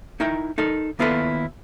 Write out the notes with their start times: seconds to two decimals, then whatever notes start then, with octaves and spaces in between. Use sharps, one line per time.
0.20 D#4 E4 A#4 G5
0.58 D#4 A4 A#4
0.99 D#2 B3 E4 F4 A4 B4